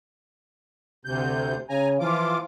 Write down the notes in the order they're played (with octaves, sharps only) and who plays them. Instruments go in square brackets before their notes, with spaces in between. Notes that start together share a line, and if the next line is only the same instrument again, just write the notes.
[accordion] D2 C3 G6
[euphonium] C#3 [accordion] G#5 A#5
[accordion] E3 F4 D6 [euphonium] F3